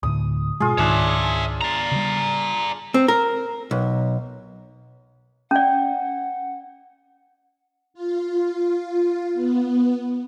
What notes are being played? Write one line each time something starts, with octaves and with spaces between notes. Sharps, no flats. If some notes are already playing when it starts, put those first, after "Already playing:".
D2 A2 D3 D#6
G#2 B2 G#3 F4 G#4
C#2 G#2 D#3 D4 G#4 C#5 E5
D5 A#5
C#3 G3
C4
A#4
B1
C#4 D5 F#5
F4
B3